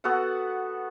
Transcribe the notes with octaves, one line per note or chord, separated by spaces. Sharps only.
B3 F#4 A4 F#5